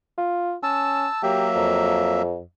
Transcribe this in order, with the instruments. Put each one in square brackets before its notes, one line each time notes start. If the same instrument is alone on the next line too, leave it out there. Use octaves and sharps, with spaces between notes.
[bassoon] F4
[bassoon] C#4 [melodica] A5 E6
[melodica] F#3 A#3 E5 [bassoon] G4
[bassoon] F2